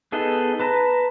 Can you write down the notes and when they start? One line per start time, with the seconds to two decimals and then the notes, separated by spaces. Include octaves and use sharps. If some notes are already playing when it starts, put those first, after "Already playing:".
0.12 B3 D#4 G#4 A4 D#5
0.59 B4 A5 A#5